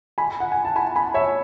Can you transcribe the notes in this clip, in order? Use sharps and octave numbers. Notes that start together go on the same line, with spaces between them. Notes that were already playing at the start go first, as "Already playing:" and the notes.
G#5 B5
F#5
G#5
A5
G#5 B5
G#5 B5
C#5 E5